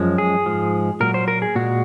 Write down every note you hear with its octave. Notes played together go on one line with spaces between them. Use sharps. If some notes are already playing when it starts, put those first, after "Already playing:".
Already playing: F#2 F3 G#3
G#4
G#2 F3 G#3
A#2 F#3 A#4
C5
A#4
G#4
A#2 G#3 F#4